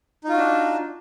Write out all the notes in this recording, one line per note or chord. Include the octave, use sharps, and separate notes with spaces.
D4 D#4 F4 F#4